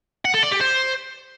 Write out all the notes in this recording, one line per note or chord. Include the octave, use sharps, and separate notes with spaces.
F#5
A4
D5
G4
C5